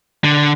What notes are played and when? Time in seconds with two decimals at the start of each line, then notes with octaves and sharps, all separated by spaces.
0.24 D3